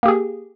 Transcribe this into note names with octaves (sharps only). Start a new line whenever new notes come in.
A#3 G4 G#4